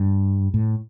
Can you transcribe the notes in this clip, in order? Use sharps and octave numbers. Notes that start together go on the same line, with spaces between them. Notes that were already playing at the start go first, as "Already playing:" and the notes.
Already playing: G2
A2